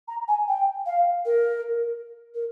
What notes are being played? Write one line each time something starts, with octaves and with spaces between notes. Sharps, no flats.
A#5
G#5
G5
F5
A#4
A#4